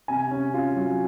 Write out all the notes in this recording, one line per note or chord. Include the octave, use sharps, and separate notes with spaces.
C3 G#5
C#4
F4
F#3